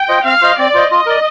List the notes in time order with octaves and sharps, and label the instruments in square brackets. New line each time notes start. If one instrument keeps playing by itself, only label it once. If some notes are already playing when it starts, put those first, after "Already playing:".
Already playing: [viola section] G5
[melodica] F4 C5 D#5
[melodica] C4 [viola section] F5
[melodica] F4 C5 D#5
[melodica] C4 [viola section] D5
[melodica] F4 C5 D#5
[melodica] F4 [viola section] D#5
[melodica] A#4 D5